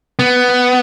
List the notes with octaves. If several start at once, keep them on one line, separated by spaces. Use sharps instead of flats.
B3